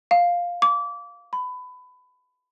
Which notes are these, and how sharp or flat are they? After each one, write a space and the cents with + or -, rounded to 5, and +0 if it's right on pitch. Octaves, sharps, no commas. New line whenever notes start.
F5 +5
D6 -25
B5 +25